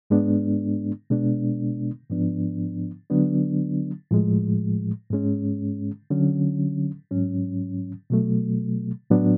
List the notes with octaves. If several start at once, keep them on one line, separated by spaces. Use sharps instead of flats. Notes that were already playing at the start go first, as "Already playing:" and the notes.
G#2 G#3 B3 D4
B2 G#3 B3 D4
G#2 F3 B3 D4
D3 F#3 B3 D4
A2 F3 G#3
G#2 G#3 C#4
D3 F#3 C#4
G#2 F#3 C#4
B2 F#3 A3
A2 F#3 B3 D4